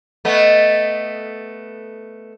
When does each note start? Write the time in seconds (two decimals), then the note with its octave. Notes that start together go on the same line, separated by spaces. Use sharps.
0.25 A3 B3 D#5